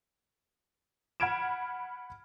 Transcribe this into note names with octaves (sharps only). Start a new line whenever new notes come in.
F#5 B5 F6 G#6 D7 E7